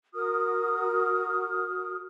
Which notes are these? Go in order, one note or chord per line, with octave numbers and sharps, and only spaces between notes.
F#4 A#4 D#6 F6